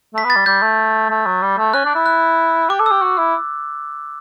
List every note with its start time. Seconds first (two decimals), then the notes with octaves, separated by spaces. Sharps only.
0.14 A3 B6
0.24 B3
0.30 A6
0.36 G3
0.46 G3 G6
0.62 A3
1.10 A3
1.26 F#3
1.42 G3
1.58 A3
1.73 C#4 F#6
1.85 D4
1.95 E4
2.06 F#6
2.70 G4 D6
2.80 A4
2.86 E6
2.91 G4
3.02 F#4
3.18 E4